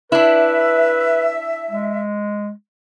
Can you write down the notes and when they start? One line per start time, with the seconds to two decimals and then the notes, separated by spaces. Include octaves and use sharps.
0.12 D4 E4 B4 E5
1.71 G#3